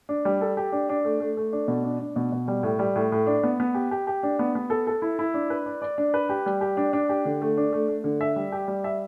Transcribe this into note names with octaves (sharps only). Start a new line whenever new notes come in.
D4
G3
A4
G4
D4
D4
A3
A3
A3
D4
B2
D4
D4
B2
B2
G3
A2
G3
A2
A2
D4
B3
B3
G4
G4
G4
D4
B3
B3
A4
A4
E4
E4
D4
B4
D5
D5
D4
B4
G4
G3
G4
D4
D4
G4
D3
A3
D4
A3
A3
D3
E5
G3
G4
G3
E5